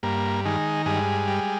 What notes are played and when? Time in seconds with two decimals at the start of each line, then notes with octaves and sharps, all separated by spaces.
0.03 G2 A#3
0.45 D#3 G#3
0.86 G2 G#3
1.28 G3